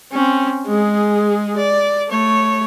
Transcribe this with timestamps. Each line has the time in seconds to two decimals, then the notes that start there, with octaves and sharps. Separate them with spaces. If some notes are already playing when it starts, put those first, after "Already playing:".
0.12 C4 C#4
0.67 G#3 G#4
1.57 D5
2.09 A3 C#5